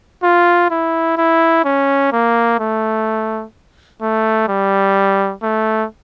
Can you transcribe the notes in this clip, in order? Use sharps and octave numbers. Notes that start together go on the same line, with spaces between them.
F4
E4
E4
C#4
A#3
A3
A3
G3
A3